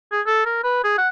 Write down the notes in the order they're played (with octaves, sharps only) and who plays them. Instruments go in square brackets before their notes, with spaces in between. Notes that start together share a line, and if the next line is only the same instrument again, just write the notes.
[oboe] G#4
A4
A#4
B4
G#4
F#5